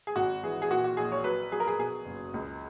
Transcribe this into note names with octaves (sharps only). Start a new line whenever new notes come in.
G#4
G#1 F#4
E3 G#4
G#4
A#2 F#4
F#4
A#1 G#4
C#5
F#3 B4
F#3 G#4
A#4
G#4
B2 G#4
F#1
C#2